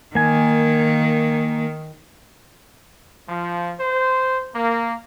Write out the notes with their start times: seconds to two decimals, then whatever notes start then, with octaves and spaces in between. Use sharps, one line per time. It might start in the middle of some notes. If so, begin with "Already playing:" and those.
0.15 D#3 A#3 G#5
3.29 F3
3.80 C5
4.55 A#3